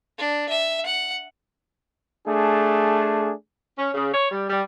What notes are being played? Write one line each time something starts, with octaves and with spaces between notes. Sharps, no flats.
D4
E5
F#5
A3 D4 G#4
C#4
C#3
C#5
G3
G3